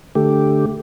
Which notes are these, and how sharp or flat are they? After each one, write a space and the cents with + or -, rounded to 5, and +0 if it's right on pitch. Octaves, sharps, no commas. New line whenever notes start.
D3 +0 A3 +0 G4 +0